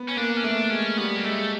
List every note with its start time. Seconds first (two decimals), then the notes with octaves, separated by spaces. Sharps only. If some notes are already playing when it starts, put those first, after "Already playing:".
Already playing: B3
0.09 C#4
0.17 A#3 D4
0.37 C#4
0.44 A3 D4
0.70 G#3 C#4
0.98 G3 B3
1.16 A#3
1.24 G#3 A3